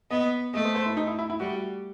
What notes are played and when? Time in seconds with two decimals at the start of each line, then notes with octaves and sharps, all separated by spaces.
0.11 B3 D#5
0.54 A3 D#5
0.65 C5
0.75 C5
0.86 E4
0.97 D#4
1.07 E4
1.19 E4
1.30 E4
1.40 G3 F#4